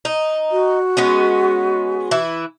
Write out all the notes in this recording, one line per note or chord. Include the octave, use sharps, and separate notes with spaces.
D#4
F#4
G#3 B3 C#4
E3 E4